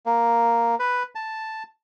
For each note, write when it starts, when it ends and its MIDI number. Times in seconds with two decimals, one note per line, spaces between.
0.06 0.75 58
0.80 1.03 71
1.15 1.63 81